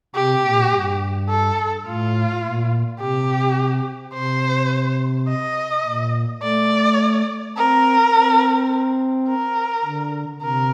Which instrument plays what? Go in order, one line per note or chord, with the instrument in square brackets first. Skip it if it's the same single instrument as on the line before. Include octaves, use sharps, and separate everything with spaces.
[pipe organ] C3 [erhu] G4
[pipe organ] A#2
G2
[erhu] A4
[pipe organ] A2 [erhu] F4
[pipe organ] A#2
[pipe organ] C3 [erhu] G4
[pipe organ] C3 [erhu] C5
[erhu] D#5
[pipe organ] A#2
[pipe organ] A3 [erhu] D5
[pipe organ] C4 [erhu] A#4
[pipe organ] C4
[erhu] A#4
[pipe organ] D3
[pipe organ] C3 [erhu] A#4